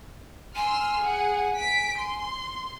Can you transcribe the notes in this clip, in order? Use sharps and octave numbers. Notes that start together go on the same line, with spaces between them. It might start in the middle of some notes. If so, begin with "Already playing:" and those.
G#5 C6 E6 F6
G#4 F#5
B6 D7
C6